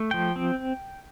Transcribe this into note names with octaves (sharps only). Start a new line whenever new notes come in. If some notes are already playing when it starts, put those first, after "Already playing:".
Already playing: A3
F3 G5
C4